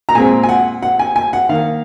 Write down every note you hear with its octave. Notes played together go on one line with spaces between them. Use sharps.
A#5
A#2 G#3 C4 G#5
G#5
F#5
F#5
G#5
G#5
F#5
D#3 A#3 F5